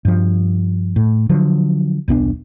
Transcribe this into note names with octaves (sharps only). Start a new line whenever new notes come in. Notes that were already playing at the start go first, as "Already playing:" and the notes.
G2 F3
A2
D3 F3 F#3
D#1 B1 B3 D4